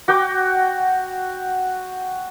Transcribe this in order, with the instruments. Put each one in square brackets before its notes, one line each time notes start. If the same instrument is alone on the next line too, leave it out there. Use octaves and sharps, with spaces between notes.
[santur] F#4 G5 D6